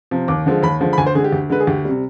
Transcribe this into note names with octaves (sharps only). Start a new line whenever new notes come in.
C3 F3
D#2 D6
D3 F3 G#3
D#2 B5
D3 F3 G#3
B5
D2 G#5
C5
D3 G#3 G#4
G4
D2
D3 G#3 B4
G#4
D2 G4
C3 G3